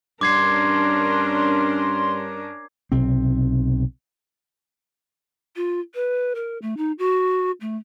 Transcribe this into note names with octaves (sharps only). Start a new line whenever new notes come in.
G2 C#4 D4 A#4 C6 D6 G#6 C7
B1 C3 C4
F4
B4
A#4
A3
D#4
F#4
A3